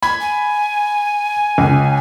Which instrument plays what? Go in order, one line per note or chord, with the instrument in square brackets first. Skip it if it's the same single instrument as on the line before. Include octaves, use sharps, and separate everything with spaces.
[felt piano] B5 [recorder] G#6
[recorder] G#5
[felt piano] C#2